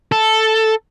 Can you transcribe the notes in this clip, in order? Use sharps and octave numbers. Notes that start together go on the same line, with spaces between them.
A4